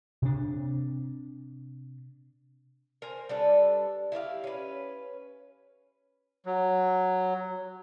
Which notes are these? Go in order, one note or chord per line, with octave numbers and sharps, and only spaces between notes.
C3 D4
A#4 C5 G#5
G3 D4 A4 B4
E4 G4 C#5 F5
C#4 B4
F#3